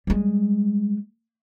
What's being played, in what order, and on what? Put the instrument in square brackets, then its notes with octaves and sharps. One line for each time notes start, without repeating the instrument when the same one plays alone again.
[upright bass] G3 G#3